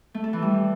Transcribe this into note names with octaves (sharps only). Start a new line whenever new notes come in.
A3
A4
E3
G3